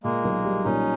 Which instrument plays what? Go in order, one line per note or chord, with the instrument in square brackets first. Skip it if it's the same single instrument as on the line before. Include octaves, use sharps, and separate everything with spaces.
[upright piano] A#2 [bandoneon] G#3 A#3
[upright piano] B1
G3
[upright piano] A#2 [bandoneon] C#4 D#4